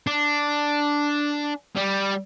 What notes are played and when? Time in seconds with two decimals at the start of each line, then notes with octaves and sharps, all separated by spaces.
0.07 D4
1.76 G3